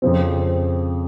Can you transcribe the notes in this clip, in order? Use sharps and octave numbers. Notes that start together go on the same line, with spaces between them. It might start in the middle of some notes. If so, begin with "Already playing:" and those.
F2 C#3 F3 C4